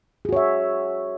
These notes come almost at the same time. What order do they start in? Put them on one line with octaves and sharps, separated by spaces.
G#4 F#4 C#5 E5